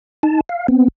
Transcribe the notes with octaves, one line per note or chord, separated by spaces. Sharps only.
D#4 A5
F5
B3 C4